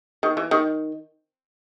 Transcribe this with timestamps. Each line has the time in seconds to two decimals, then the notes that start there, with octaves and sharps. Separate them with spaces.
0.23 D#3
0.37 E3
0.51 D#3